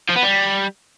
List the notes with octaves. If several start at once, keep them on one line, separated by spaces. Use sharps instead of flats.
F3
B3
G3